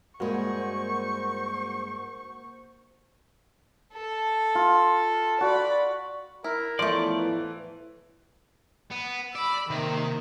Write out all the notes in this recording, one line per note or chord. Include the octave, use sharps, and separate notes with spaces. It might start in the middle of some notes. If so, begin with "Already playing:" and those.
G2 G#3 A#3 F#4 C5 C#6
A4
F4
F#4 D5 B5
E4 A#4
E2 A2 F3 A3 C5 D5
E3
B3
D5 B5 E6
C3 D#3 A#3